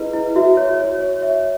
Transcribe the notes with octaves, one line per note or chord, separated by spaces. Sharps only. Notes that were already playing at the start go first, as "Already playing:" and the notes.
Already playing: E4 G#4 B4 D#5
E4
F#4 E5
C#5
C#5
C#5
C#5 E5